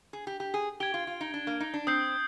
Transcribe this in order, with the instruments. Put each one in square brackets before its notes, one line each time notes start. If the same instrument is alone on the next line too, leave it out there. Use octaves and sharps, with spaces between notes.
[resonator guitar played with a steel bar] G#4
G4
G4
G#4
[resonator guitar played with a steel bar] G4 [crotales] G#6 D7 G7
[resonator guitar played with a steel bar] F4
F4
D#4
D4
A#3
D#4
D4
[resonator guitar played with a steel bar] C4 [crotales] D#6 G6 C7